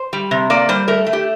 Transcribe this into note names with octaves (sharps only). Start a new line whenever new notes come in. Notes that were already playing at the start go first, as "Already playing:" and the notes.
Already playing: C5
G3
C3
A#3 D5
G3 C5
A3 A#4
A3
G4